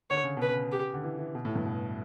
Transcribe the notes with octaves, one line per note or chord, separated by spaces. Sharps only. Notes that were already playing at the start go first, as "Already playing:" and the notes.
D3 C#5
C#3
B2 B4
C#3
G4
D3
E3
E3
B2
A2
G2
B2